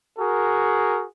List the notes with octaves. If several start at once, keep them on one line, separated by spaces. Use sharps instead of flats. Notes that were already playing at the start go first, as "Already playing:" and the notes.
F#4 G#4 A#4